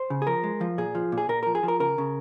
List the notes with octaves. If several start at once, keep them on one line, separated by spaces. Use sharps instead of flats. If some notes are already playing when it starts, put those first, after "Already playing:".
Already playing: C5
C#3
G#4
F3 A#4
G#3
F3
A#2 G#4
F3
A#2
G#4
A#2 A#4
F3 A#4
G#4
F3
A#4
C#3 A#4
C#3